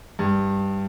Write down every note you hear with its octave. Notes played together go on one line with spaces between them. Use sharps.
G2